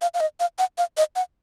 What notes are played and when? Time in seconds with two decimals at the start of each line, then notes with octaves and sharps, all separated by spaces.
0.02 F5
0.14 F5
0.20 D#5
0.40 F5
0.58 F#5
0.78 F5
0.97 D#5
1.16 F#5